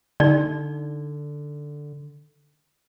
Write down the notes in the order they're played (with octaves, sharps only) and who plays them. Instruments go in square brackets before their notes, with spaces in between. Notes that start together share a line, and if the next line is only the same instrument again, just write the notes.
[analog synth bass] D3 [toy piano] D#4 D5